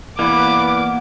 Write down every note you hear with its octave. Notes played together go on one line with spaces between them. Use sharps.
E3 A#3 B3 B4 D5 B5 D6